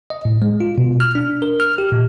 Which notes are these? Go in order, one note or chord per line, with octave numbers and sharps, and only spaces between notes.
D#5
A2
G#3
F4
B2
F6
D4
A#4
F6
G4
A#2